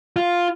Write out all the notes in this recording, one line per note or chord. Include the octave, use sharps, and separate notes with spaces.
F4